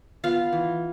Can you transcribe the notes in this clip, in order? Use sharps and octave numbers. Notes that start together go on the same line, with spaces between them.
B3 F4 F5
E3